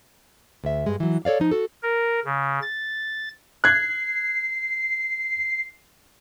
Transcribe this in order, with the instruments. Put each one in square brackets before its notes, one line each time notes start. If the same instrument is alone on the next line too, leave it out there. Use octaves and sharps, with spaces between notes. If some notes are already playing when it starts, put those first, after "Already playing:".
[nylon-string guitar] D2 E5
G2 G#3
E3 F#3
A4 C#5 D5 F5
F3 D#4
F#4 A4
[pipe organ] A#4
C#3
A6
[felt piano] F#6 G#6 [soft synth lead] C7